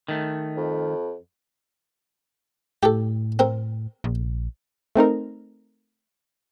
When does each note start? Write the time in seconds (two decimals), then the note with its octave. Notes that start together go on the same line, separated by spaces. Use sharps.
0.08 D#3 A3
0.57 F2
2.83 A2 G4 A4
3.39 C4 A#4
4.04 A#1
4.96 A3 C4 D#4 A#4